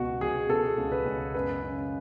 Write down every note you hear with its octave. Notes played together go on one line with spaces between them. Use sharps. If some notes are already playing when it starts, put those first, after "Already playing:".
Already playing: C#2 B2 F#4
B2 G#4
B2 A4
C#2
B4
C#2
F#2 B4
C#3